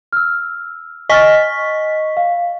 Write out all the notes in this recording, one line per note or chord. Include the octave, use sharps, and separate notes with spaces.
E6 F6
D#5 G#5 C#6 F6 A6 B6
F5